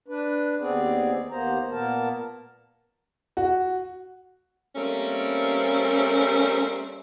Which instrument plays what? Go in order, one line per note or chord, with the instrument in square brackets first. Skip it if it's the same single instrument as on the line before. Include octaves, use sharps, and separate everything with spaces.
[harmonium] D4 B4
D#2 B3 C4 G#4 D5
D#2 A#3 B3 C5 A#5
A#2 A#3 B3 A#4 A5
[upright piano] F#4
[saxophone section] G3 A3 A#3 C4 C#4